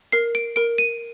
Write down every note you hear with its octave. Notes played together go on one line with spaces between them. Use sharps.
A#4 C7
D7
A#4 D7
D#7